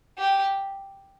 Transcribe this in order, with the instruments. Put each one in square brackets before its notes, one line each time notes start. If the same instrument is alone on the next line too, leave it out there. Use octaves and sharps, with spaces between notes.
[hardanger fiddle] G4